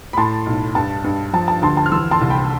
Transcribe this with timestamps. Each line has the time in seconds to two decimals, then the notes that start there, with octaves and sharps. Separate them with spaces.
0.13 B5
0.17 A2 A5 C6
0.46 B1
0.75 G2 A5
1.04 G2
1.33 F3 A5
1.48 A5
1.62 D2 A5 C6
1.77 A5
1.86 F6
1.92 E3 C6 E6
2.11 A5 C6
2.21 C2
2.30 G5 B5